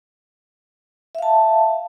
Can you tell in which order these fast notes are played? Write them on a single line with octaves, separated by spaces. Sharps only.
E5 F5 A5